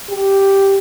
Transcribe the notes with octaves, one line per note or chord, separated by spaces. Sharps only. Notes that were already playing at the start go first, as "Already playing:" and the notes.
G4